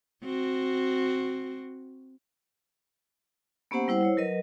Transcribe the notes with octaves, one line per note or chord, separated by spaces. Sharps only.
C4 F#4
A#3 B3 C#4 G4 C5 F#5
G3 E4 C5 F#5
E4 C5 C#5
F#3 A#4 B4 D#5